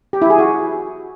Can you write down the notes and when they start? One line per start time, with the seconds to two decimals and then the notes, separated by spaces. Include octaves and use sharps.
0.13 G4
0.22 E4
0.30 G#4
0.39 F#4